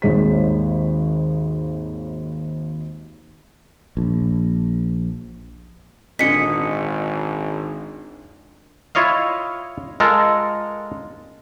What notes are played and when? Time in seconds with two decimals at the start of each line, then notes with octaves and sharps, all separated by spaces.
0.02 G#1 D#2 G#3 C#5 B6
3.97 A#1
6.19 G#1 A#2 D3 G#4 D#5 B6 C#7
8.95 E4 F4 C#5 D#5 F5
10.00 G#3 F4 A4 A#4